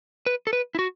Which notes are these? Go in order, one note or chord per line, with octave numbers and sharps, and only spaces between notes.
B4
A4
B4
E4
F#4